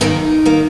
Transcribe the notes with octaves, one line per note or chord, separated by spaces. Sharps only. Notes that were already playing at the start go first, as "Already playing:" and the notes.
F#2 D#3 A#3 B3 D#4
D#3 A#3